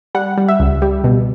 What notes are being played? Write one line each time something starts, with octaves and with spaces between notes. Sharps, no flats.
G3 F#5
G3
E5
C#2
G3
B2